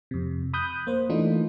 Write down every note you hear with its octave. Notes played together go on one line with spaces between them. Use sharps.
F2 C3
B5 D#6 F#6 G6
A#3 C5
E3 A3 D4 D#4 F4